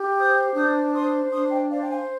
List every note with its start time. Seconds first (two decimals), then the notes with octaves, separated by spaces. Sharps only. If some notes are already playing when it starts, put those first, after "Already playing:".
Already playing: G4
0.18 C5 D#6 G6
0.56 D4 D#6 G6
0.93 C5 C6 D#6
1.32 D4 C6 D#6
1.51 D#5 G5
1.70 C5 D5 F5
1.81 G5
1.89 F5 G#5